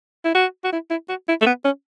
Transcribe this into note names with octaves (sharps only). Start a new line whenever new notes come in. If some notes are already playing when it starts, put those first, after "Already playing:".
E4
F#4
F#4
E4
E4
F#4
E4
A3
B3
C#4